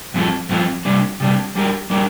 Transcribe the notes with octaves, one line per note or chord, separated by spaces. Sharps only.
G2 F3 C4 F4 A4
G2 F3 C4 F4 A4
C3 G3 D4
C3 G3 D4
G3 D4 G4 A#4
G3 D4 G4 A#4